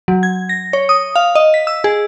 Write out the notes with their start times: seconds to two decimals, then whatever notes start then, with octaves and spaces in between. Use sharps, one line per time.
0.08 F#3
0.23 G#6
0.49 A#6
0.73 C#5
0.89 D#6
1.16 F5
1.35 D#5
1.54 B6
1.67 E6
1.84 G#4